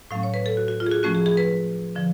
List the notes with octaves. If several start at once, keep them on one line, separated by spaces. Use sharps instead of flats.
A2 F#3 A3 C#4 F5
C#5
B4
A4
F#4
F#4
F4
G#4
F#4
F3 A3 C#4 F#4
G#4
G#4
B4
D3 F3